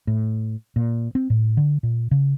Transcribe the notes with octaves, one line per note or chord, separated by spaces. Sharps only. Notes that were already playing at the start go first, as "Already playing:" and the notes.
A2
A#2
C4
A2
D3
A#2
C#3